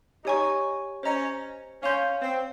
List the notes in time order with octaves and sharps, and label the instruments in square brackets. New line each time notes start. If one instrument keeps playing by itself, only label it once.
[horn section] D#4 [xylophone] G4 C#5 G#5 C#6
[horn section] C#4 [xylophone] C5 D#5 A#5
[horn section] C#4 [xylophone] C#5 F5 C6 G6
[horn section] C4